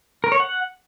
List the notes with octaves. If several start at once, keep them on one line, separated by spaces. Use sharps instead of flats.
A#4
C#5
F#5